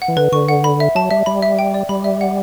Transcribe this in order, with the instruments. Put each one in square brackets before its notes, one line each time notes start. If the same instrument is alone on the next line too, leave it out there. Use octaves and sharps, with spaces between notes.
[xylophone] F#5
[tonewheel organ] E3
[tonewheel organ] D3 [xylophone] B4
[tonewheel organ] D3 [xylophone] C#6
[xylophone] F#5
B5
E5
[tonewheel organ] F#3 [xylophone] A5
[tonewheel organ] G3 [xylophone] E5
[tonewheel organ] G3 [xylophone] B5
[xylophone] E5
G5
D5
[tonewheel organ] G3 [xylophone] B5
[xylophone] E5
F#5